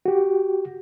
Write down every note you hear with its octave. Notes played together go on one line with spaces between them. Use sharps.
F#4 G4